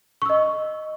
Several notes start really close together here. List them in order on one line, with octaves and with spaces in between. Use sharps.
C#6 E6 D#5